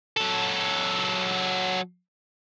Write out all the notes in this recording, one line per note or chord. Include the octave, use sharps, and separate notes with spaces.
F#3 A4